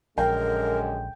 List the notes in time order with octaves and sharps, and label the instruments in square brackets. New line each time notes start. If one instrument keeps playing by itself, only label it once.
[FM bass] A#1 [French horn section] F#2 D3 G#3 [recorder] A#4 [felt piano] G5